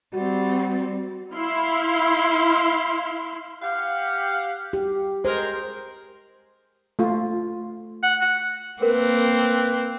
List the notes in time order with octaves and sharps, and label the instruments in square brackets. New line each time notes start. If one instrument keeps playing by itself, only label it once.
[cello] G3 C4 [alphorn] F#4
[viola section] E4 F5 C6
[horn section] G4 F5 F#5
[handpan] G4
[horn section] G#3 A#4 [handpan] C5
[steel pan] A3 F4
[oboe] F#5
F#5
[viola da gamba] A#3 C4 [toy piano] A#4 [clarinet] B4